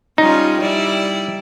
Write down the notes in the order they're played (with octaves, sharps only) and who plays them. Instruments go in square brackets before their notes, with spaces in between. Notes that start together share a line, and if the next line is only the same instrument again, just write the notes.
[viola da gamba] G3 C#4 F4 [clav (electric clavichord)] D#4
[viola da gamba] G3 E4 D5